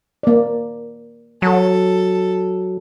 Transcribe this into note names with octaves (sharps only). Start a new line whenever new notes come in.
A#3 D5
F#3 A4